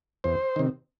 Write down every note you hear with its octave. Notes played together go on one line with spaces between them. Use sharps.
E2 C5
C3 D#3